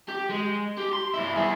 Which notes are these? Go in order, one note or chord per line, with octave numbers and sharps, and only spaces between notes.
G4
G#3
G4
C6
G2 E4
E4 G#4